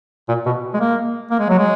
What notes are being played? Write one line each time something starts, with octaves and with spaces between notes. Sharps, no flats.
A#2
B2
G#3
A#3
A#3
G#3
F#3
G#3